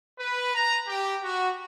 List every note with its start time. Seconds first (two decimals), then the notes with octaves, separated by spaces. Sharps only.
0.18 B4
0.54 A#5
0.86 G4
1.23 F#4